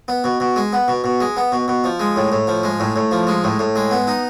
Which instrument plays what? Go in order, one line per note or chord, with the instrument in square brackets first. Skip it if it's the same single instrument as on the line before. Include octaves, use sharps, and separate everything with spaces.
[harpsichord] B3
B2
B2
G#3
B3
B2
B2
G#3
B3
B2
B2
F3
G#3
A2
A2
F3
G#3
A2
A2
F3
G#3
A2
A2
G#3
B3
D#4